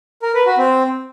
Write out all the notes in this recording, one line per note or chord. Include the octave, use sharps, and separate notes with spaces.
A#4
B4
F#4
C4